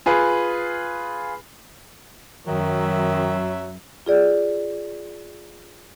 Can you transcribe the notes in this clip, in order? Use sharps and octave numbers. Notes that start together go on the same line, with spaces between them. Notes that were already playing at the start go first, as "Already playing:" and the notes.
F4 G#4 B4
F#2 D#3 F#3 E5
F4 G#4 D5